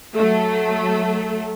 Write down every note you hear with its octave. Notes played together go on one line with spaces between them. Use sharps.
F#3 A3